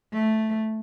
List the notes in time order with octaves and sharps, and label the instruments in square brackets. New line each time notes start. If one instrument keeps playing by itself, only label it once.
[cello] A3